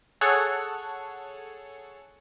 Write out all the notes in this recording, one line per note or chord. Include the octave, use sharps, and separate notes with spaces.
G#4 A4 C#5 F#5